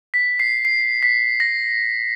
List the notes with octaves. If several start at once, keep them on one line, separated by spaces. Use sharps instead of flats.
B6
C7
C7
B6
A#6